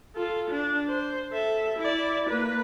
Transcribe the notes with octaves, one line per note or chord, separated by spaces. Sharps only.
F4 A4
D4
C5
A4 E5
E4 D5
A#3 B4